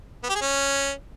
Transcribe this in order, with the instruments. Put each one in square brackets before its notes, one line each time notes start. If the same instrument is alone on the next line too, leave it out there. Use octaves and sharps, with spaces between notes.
[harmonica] B3
G4
G#4
C#4